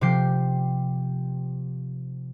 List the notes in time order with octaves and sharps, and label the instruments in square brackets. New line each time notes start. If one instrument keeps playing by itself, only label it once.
[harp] C3 F3 G4 G5 C7